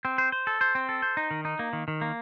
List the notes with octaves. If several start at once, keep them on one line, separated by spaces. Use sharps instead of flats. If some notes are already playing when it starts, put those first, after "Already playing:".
C4
C5
C5
A4
C5
C4
A4
C5
D#4
D#3
D#4
A#3
D#3
D#3
A#3